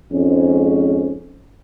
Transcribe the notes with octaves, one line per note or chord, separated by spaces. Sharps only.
F2 G#2 G#3 C#4